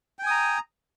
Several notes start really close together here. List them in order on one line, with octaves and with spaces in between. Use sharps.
G5 G#5 D#6 A#5